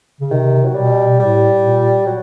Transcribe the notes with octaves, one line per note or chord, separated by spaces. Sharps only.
C#3
C3 D#3
F#3
B2 G3
A2 G3
A#2
F#3